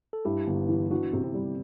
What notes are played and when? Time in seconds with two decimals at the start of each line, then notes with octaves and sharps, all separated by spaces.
0.13 A4
0.25 G2 E4 G4
0.47 G1
0.69 E3
0.91 E3 D4 F#4
1.13 C3
1.24 C4 E4
1.34 G3